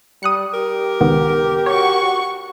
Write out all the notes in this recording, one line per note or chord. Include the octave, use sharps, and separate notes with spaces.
G3 D#6 F#6 C#7
G4 A#4
C#2 D#3 B3
F#4 C#5 C#6